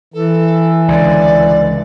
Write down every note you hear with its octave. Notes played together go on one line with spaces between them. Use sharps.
E3 A4
C#2 D3 D5